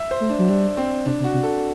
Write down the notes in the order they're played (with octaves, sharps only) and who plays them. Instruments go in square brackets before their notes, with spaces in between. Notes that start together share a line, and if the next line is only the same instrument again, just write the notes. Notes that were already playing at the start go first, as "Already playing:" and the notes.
Already playing: [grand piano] E5
C5
[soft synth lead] A3
[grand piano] D4
[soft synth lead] F#3
[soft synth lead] G3 [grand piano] D4
[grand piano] C4
[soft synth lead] C3 [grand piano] D4
[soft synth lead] C3
[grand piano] F#4
[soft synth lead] C3
[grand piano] A4